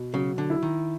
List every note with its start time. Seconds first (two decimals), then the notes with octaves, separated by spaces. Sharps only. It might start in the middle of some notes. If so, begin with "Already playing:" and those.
Already playing: B2
0.13 C#3 F#3
0.38 D3
0.50 E4
0.63 D#3